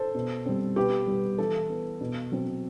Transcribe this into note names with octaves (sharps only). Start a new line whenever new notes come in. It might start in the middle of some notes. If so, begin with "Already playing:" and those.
Already playing: A4 C5
B2
G3 C4
B2 G4 B4
G3 B3
E3 A4
B3
B2
F#3 C4